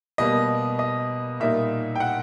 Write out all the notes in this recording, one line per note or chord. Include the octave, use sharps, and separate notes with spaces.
B2 G3 A#3 D#5
D#5
A#2 G3 A#3 D#4 E5
G5
F#5